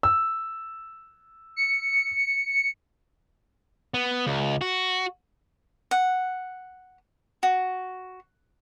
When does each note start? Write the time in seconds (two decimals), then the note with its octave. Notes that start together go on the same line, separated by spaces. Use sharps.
0.03 E6
1.56 C#7
3.94 B3
4.26 C#2
4.61 F#4
5.91 F#5
7.43 F#4